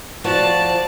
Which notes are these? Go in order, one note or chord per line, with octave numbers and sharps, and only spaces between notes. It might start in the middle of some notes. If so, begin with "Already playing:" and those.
F3 F#4 C5 D5 A5